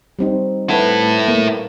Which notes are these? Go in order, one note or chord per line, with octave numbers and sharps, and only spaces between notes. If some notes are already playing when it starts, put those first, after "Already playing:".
G3 C4 D#4
E4 A4 B4 F#5
A#3